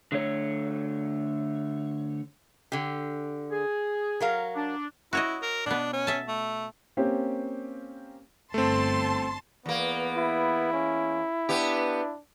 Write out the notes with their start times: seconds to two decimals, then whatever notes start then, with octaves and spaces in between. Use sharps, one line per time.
0.12 D3 A3 C#5
2.72 D3 G4
3.52 G#4
4.20 F#3 A#4 F5
4.56 D4
5.13 E4 F#4 C#5 D#5
5.42 A#4
5.66 B2 B3 D4
5.93 C#4
6.07 E5 A5
6.28 A3
6.97 A#3 C4 C#4 G4
8.54 G1 A3 C4 A5 C6
9.66 E2 A#3 B3
10.17 E4
10.73 C#4
11.49 B3 D4 G4